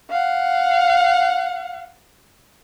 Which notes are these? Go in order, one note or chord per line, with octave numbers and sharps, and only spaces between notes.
F5 F#5